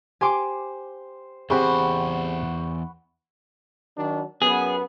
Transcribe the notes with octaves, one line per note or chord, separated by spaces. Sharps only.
G4 C5 G#5 C6 D6
E2 C4 G4 G#4 C5 F#5 B5 C#6
D#3 F#3 D4
F#2 B3 G#4